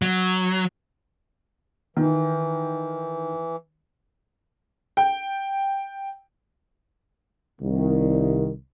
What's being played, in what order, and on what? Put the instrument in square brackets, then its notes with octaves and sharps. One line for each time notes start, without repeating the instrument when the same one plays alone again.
[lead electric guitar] F#3
[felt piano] D#3 [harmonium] E3
[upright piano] G5
[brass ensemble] C2 D#3